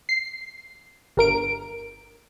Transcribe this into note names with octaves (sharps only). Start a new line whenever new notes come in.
C7
G1 A#4 D7